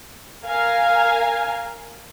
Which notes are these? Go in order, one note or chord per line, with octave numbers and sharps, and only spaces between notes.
A#4 F5 G#5 A#5